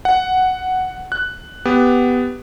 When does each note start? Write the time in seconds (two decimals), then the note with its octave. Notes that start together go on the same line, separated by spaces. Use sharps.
0.05 F#5
1.12 F#6
1.65 B3 G4